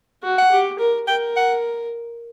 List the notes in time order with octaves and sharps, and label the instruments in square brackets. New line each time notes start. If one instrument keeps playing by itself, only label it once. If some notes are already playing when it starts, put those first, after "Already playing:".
[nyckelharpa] F#4
[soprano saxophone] F#5
[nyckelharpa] G4
A#4
[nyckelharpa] A#4 [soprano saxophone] G5
[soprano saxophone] F#5